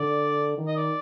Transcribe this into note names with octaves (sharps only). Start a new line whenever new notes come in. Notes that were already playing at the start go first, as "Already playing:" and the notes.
Already playing: D3 D5
D#3
D#5
D5